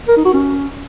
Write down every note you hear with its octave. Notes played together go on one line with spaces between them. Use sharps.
A#4
D#4
F#4
C#4